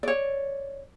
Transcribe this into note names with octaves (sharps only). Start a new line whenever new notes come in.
C#5 D5